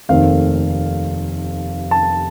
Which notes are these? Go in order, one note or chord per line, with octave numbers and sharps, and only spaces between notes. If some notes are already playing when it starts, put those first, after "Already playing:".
F1 D#2 D#3 A3 C4 F5
A5